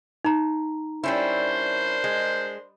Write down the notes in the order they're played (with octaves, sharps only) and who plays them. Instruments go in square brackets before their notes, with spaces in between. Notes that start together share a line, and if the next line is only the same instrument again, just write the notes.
[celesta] D#4 A#5
[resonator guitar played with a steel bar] G3 C#4 E4 [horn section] D4 A#4 C5
[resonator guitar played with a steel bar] G#3